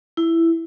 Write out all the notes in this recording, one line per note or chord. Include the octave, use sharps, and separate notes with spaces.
E4